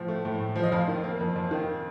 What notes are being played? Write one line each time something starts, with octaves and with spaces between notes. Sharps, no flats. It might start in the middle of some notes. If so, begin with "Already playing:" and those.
Already playing: A2 F3
A3
A2
A2
F3
D#5
F2 F5
D#3
A#3
F2
F2
D#3